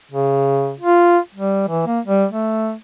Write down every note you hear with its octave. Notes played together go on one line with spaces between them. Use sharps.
C#3
F4
G3
E3
A#3
G3
A3